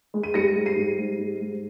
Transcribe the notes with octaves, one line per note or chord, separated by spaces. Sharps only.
G#3
D#7
G3 A#6 C#7
G#2
C7 D#7
G3
G#2
G3
G#2